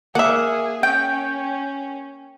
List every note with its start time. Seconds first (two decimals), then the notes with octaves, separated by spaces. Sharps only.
0.15 A#3 G#4 E5 F#5
0.83 C#4 G5